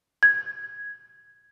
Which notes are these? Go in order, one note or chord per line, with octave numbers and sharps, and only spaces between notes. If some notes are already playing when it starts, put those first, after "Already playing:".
G#6